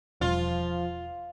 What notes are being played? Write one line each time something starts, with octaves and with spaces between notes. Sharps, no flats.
E1 F3 G3 F4